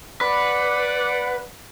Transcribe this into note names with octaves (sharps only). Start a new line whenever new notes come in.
B4 D5 F#5